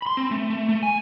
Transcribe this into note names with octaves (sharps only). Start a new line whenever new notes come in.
B5 C6
C4
A3
A3
A3
G#5